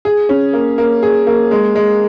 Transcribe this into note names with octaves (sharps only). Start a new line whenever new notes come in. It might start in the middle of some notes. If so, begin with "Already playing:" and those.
G#4
C#4
A#3
A#3
G#4
A#3
G#3
G#3